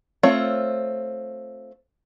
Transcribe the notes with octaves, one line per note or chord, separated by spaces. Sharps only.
A3 C4 F4 C#5